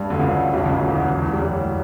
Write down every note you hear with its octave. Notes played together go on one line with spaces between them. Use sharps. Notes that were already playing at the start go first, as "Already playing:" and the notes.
Already playing: G2 G3
D2 D3
C#2 C#3
B1 B2
C#2 C#3
D2 D3
E2 E3
E2 E3
E2 E3
G3
F#2 F#3
A2